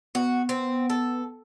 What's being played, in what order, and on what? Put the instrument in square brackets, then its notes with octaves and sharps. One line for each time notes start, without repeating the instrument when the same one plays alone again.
[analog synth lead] B3 [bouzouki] F#4
[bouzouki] C4
A4